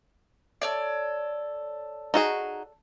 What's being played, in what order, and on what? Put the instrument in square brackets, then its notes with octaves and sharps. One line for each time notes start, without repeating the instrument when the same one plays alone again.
[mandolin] A4 C#5 D5
[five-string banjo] D#4 F#4 G#4